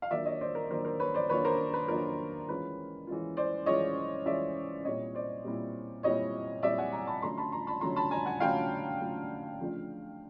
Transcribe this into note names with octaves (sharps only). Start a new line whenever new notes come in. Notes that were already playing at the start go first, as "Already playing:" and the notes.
F5
D#3 F#3 A#3 D4 F4 D5 E5
C#5 D#5
C5 D5
A#4
D#3 F#3 A#3 D4 F4 A#4 C5
A#4 C5
B4 C#5
C5 D5
D#3 F#3 A#3 D4 F4 B4 C#5
A#4 C5
B4
D#3 F#3 A#3 D4 F4 A#4
E3 G#3 C#4 F4 B4
E3 G#3 C#4 F4
C5 D5
E3 G#3 C#4 F4 C#5 D#5
E3 G#3 C#4 F4 D5 E5
A#2 G3 C4 E4 C#5 D#5
C5 D5
A#2 G3 C4 E4
A#2 G3 C4 E4 C#5 D#5
A#2 G3 C4 E4 D5 E5
F#5 G#5
G#5 A#5
A5 B5
D3 F#3 A3 C#4 F4 A#5 C6
A5 B5
A#5 C6
A5 B5
D3 F#3 A3 C#4 F4 A#5 C6
A5 B5
G#5 A#5
F#5 G#5
D3 F#3 A3 C#4 F4 F5 G5
D3 F#3 A3 C#4 F4
C#3 F3 A3 D4 F4